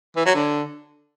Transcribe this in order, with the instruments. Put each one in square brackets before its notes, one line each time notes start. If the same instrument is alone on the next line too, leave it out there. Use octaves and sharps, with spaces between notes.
[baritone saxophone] E3
F#3
D3